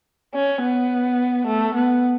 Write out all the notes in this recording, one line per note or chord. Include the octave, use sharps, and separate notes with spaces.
C#4
B3
A3
B3